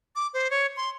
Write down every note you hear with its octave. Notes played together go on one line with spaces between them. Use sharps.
D6
C5
C#5
C6